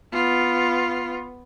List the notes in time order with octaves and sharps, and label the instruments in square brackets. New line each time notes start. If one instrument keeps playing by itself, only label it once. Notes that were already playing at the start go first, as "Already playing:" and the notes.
[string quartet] B3 [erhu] F4